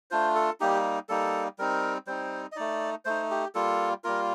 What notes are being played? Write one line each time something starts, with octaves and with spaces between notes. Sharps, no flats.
A3 D4 F4 C5
A4
G3 A#3 D#4 G4
G3 A#3 D#4 A4
G3 C4 D#4 A#4
G3 C4 D#4 C5
D#5
A3 D#4 D5
A3 D#4 C5
G4
G3 A#3 F4 A4
G3 A#3 F4 A#4